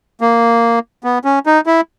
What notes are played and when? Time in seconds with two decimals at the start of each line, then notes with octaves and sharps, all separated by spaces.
0.21 A#3
1.04 B3
1.25 C#4
1.46 D#4
1.66 E4